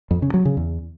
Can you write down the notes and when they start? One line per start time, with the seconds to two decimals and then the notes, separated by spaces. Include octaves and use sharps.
0.11 F2
0.22 C#3
0.34 F#3
0.45 C#3
0.57 E2